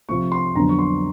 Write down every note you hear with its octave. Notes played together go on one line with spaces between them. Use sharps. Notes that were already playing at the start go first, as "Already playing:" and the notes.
C3 F3 A3 C#6
C6
F2 D3 F#3 B3 A#5
C#6
C6